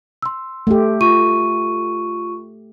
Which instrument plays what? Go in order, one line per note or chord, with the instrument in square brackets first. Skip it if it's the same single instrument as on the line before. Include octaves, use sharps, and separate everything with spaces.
[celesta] C6 E6
[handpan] A3 G4
[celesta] F4 C#6 D#7